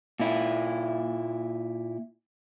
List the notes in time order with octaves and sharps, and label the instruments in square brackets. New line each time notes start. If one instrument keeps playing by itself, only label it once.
[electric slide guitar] A#2 E4